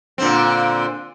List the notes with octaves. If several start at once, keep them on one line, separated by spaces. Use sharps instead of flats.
A#2 D3 C4